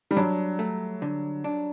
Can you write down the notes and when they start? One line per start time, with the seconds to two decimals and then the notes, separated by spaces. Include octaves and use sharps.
0.11 G3
0.17 F#3 D4
0.59 A3
1.02 D3
1.44 D4